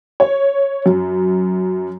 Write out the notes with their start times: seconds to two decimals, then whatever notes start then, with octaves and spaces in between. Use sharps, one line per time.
0.20 C#5
0.86 F#2